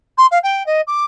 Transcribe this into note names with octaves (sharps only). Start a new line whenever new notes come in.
C6
F5
G5
D#5
D6